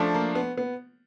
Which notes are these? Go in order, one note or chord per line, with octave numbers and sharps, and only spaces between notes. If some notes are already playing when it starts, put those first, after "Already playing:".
Already playing: F3 A3 D4
A#3
B3
B3